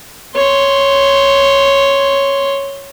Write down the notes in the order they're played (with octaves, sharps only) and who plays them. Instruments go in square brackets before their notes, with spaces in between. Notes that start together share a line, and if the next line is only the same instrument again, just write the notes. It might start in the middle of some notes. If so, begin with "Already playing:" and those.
[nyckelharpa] C#5 C6